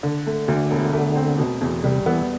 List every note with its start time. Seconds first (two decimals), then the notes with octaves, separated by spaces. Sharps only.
0.03 D3
0.27 A3
0.48 D2 D3
0.71 E1
0.93 A3
1.16 C4
1.38 B2
1.61 E2
1.84 C3 G3
2.06 E3 B3